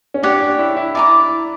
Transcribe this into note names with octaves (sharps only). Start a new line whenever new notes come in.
C#4
D4 G4 C#5 F#5
D4
E4
E4
E4 D5 A#5 D6